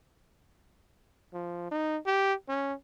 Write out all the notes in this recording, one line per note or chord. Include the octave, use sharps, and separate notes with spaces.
F3
D#4
G4
C#4